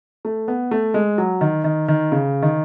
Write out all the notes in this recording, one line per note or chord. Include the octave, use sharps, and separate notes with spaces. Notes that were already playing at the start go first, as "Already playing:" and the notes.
A3
B3
A3
G#3
F#3
D#3
D#3
D#3
C#3
D#3